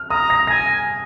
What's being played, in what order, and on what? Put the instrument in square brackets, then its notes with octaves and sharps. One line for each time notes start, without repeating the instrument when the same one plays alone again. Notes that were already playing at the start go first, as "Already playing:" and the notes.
Already playing: [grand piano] F6
[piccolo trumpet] A#5 [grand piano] D#6
[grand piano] A#6
[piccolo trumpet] G#5 [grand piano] A#6